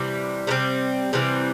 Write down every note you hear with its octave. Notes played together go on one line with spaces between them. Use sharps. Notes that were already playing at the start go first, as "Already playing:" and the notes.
Already playing: C3 E3 G3 C4
C3 E3 G3 C4
C3 E3 G3 C4